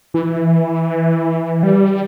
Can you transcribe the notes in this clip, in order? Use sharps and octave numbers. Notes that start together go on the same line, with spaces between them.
E3
G3